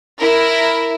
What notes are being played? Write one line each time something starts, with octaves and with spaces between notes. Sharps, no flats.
E4 A#4